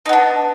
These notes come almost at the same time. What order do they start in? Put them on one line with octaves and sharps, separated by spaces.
D#4 B3 D4